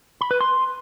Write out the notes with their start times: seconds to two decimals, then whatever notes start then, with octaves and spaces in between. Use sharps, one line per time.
0.21 B5
0.31 B4
0.41 C6